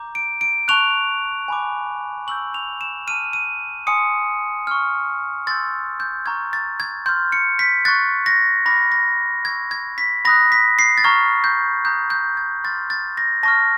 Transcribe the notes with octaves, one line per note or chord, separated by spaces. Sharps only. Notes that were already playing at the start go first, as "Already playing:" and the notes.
Already playing: A#5 D6 G6
D7
D7
A5 C#6 F#6 F7
G#5 B5 D6
C#6 E6 G6 F#7
F7
E7
A5 D6 F6 D#7
D#7
G#5 C6 D#6 C#7
C#6 F6
C6 E6 G6 A6
G6
A#5 C#6 F6 G#6
A6
G#6
C6 F6 G6
C#7
B6
C#6 F#6 A6
A#6
B5 D6 F6 A#6
A#6
C#6 E6 G6 G#6
G#6
B6
B5 D#6 F#6 A#6
B6
C7
A6
A#5 C#6 F6 G#6
G6
A#5 D#6 F#6 G6
G6
G#6
C6 F6 A6
A6
A#6
A5 C#6 F6 A#6